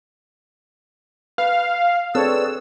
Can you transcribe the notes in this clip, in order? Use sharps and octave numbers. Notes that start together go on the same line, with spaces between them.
B4 F5
C4 G#4 A4 B4 C#5 D5 E6